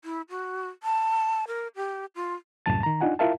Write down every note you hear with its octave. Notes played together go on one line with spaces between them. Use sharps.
E4
F#4
A5
A#4
G4
F4
C2 F#2 A2 A5 A6
D#3 A#5
D4 D#4 F4 F#5 G#5
E4 F4 A#4 E5 F5 A5